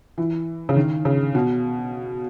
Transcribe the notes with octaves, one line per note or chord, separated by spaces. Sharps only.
E3
C#3
D#3
C#3
B2